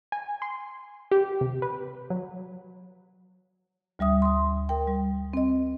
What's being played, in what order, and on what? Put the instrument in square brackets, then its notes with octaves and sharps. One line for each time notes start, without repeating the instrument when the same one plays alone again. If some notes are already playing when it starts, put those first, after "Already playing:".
[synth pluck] G#5
C6
G4
C3
B4
F#3
[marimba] D2 G3 E5 D#6
C6 D#6
A#4 G5
G3
C4 D#5